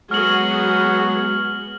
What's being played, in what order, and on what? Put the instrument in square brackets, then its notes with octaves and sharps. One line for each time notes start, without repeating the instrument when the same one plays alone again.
[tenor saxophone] F#3 [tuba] G#3 [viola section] B3 F#4 G#4 [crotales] F6 F#7